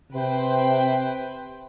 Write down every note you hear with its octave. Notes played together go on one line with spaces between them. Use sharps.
C3 B4 C5 G5